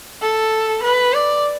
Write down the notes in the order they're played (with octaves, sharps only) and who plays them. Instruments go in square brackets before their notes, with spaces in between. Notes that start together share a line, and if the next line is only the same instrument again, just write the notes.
[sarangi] A4
B4
D5